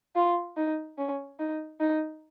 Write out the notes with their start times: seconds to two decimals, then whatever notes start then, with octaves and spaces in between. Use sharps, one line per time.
0.16 F4
0.57 D#4
0.98 C#4
1.39 D#4
1.80 D#4